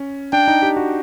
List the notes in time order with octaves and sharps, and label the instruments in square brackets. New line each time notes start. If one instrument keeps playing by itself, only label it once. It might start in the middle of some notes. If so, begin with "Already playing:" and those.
Already playing: [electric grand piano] C#4
[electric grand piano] D4 [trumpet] G5
[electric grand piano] D#4
G4
F#4